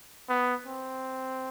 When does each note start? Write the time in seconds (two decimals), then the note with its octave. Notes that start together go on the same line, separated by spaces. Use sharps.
0.29 B3
0.66 C4